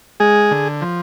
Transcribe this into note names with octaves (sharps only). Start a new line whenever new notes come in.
G#3 G#4
D3
F3